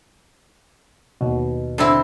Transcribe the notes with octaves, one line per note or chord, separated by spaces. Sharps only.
D#2 B2
D3 C4 E4